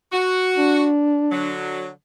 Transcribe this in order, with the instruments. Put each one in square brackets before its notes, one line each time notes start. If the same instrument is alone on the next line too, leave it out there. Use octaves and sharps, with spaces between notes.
[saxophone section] F#4
[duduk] D4
[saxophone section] D3 F#3